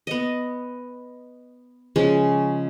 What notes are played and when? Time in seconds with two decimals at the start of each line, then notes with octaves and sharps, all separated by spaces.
0.07 B3 D#5
1.96 C#3 F3 G#3 C#4